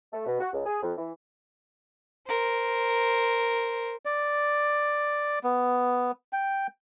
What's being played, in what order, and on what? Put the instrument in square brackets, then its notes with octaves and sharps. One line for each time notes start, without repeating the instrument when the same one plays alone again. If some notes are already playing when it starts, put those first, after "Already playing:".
[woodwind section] A3
B2
F#4
C#2
G#4
F2
E3
[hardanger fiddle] A#4 C5
[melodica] D5
B3
G5